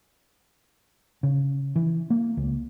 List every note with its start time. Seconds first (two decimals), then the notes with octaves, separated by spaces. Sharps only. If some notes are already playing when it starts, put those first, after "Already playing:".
1.23 C#3
1.76 E3
2.10 A#3
2.37 C#2